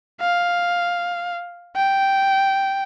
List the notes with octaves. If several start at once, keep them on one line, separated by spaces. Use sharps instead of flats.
F5
G5